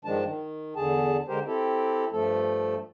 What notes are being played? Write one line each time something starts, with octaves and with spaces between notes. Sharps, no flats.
G2 D#3 F3 G#3 D4 A5
D#3
E2 D3 G#4 A5
D3 G#3 G4 A#4 C5
C4 E4 G4 A4
G2 F3 A3 A4